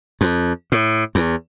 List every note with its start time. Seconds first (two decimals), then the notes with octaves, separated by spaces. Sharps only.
0.21 F2
0.72 A2
1.15 E2